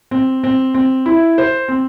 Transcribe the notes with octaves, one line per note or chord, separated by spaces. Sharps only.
C4
C4
C4
E4
C5
C4